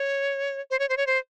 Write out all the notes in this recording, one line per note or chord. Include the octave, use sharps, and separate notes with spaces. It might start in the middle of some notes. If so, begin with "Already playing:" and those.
Already playing: C#5
C5
C#5
C5
C#5
C5